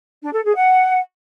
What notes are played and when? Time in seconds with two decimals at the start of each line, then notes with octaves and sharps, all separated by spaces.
0.22 D4
0.33 A4
0.44 G#4
0.55 F#5